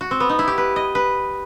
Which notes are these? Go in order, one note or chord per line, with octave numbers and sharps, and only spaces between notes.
F#4
C4
B3
D#4
E4
G4
B4
D#5
B4